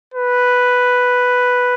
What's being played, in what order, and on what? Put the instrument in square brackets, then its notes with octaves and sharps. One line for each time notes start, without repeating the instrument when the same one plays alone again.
[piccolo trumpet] B4